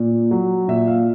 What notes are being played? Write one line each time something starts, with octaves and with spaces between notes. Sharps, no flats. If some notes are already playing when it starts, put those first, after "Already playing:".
Already playing: A#2
F#3
A#2 E5
F5